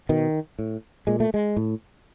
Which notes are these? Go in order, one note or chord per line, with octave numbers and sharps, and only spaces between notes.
B2 D#3
A2
A#2 G#3
A3
G#3
A2